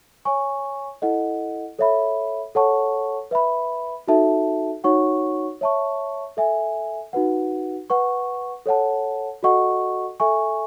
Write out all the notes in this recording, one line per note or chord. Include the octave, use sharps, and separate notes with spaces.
C#5 G#5 C#6
E4 A4 D#5 F#5
A4 C#5 E5 B5
A4 C#5 F#5 A5 C#6
B4 E5 B5
D#4 F#4 A4 E5 A5
D#4 F#4 C#5 F#5 C#6
C#5 E5 A5 C#6
A4 E5 G#5
D#4 F#4 B4 F#5
B4 F#5 C#6
A4 C#5 F#5 A5
F#4 A4 D#5 F#5 C#6
A4 E5 G#5 C#6